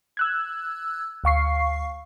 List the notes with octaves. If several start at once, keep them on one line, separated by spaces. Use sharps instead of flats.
E6 F#6 G#6
D2 F5 C#6 C7